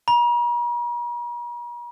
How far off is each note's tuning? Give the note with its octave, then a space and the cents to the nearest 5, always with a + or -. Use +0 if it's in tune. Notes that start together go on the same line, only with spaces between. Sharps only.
A#5 +45